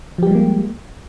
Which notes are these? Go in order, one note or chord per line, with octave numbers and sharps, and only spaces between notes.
F3 G3 G#3 A#3 G4